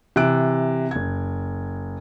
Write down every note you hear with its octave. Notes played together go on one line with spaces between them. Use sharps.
C3 E3 E6 F#6 D7
F#1 G#6